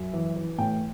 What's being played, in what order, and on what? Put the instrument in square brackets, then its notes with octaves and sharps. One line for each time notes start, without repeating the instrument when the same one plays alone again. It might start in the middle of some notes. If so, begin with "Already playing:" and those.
Already playing: [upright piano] F#2 E5
E3
E3
A2 G5